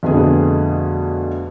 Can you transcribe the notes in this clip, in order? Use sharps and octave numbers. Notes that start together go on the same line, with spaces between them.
F2 B2 D3 A3 B3 G#4